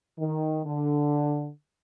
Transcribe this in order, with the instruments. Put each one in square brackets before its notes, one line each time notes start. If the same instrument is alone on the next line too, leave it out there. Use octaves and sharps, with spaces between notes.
[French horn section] D#3
D3